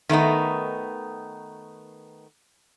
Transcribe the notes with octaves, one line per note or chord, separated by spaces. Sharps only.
D#3 A3 B3 D#4